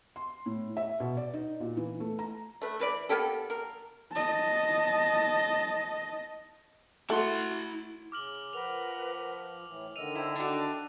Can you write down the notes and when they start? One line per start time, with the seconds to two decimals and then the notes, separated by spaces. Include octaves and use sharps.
0.16 C6
0.46 A2
0.77 E5
1.00 B2
1.17 D5
1.34 D#4
1.60 A#2
1.77 E3
2.00 A3
2.19 A#5
2.62 A3 B4
2.80 E3 B4 D5
3.09 A#3 B3 G4 A4
3.50 A#4
4.12 D#5 A5
7.10 A3 E4 F#4 C6
8.12 C#3 D6 F6 F#7
8.53 F3 A#4 B4 F#5 F7
9.67 A2 E3
9.96 D3 D#3 D#5 E6 D#7 F7
10.15 E4 C5 G5 A#5
10.35 D4 F#4 A4 G5 D6